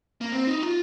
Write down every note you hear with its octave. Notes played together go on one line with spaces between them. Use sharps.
A#3
C4
D#4
F4